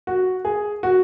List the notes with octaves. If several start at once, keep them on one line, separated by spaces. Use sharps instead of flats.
F#4
G#4
F#4